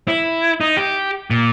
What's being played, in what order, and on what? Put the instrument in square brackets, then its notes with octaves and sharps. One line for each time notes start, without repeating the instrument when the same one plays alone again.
[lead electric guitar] E4
D#4
G4
A#2